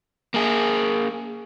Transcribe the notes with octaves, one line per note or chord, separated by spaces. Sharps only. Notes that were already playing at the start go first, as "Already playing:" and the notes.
A#3 G#4